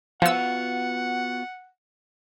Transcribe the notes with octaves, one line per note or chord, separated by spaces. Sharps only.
F3 B3 F4 F#4 F#5 E6